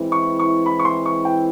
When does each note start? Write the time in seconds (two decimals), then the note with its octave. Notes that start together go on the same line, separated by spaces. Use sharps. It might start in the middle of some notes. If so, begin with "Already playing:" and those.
Already playing: E3 G#3 C4 E4
0.12 C#6
0.39 C#6
0.66 B5
0.79 C#6
0.85 C6
1.06 C#6
1.25 G5